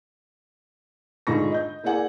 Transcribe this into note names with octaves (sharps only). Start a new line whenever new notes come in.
G#2 D3 F4 B5 C#6 A#6
D#5 G6
A#3 E4 G#4 D5 F#5 G#5